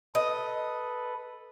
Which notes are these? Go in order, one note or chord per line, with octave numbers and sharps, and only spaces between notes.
A4 B4 D#5